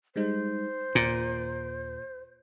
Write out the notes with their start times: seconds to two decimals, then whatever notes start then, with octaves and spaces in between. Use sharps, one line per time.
0.16 G3 G#3 D#4 C5
0.95 D#2 A#2